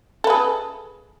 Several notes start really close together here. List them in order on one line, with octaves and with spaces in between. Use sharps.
A4 B4 G#4